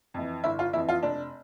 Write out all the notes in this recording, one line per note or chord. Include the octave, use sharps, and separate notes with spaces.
F2 E3
G1 E4
F4
F2 E3 E4
F4
F1 D4